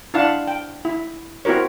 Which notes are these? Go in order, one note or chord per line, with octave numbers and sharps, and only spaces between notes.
D4 E4 F5 F#5 A5
G5
E4
C4 E4 F#4 A#4 C#5